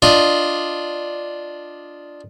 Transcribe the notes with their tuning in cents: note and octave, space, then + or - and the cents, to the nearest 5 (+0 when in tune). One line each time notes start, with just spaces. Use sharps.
D4 +0 F4 +0 D#5 +0